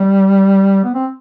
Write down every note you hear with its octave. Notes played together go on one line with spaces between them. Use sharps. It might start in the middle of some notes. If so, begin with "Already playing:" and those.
Already playing: G3
B3
C4